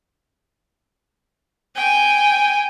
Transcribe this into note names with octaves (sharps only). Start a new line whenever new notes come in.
G5 G#5